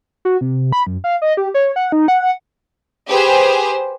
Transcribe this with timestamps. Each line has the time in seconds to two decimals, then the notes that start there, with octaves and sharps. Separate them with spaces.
0.25 F#4
0.41 C3
0.73 B5
0.86 F#2
1.04 F5
1.22 D#5
1.37 G4
1.54 C#5
1.76 F#5
1.92 D#4
2.08 F#5
3.09 G4 G#4 B4 C5